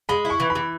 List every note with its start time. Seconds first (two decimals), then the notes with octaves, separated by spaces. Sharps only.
0.09 G#3 B5
0.25 E4
0.30 C#6
0.40 E3
0.50 B5
0.55 E3